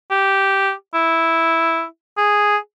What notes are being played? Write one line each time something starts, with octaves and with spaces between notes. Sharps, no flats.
G4
E4
G#4